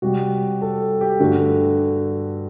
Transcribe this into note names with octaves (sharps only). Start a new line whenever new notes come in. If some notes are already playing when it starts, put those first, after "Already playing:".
C3 G3 F#4
A4
G4
G2 D3 A3 F#4